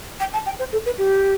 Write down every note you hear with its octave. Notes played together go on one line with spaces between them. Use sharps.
G5
A5
G5
C5
A4
B4
G4